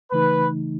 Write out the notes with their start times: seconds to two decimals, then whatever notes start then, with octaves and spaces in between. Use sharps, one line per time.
0.11 C#3 E3 A3 D#4 B4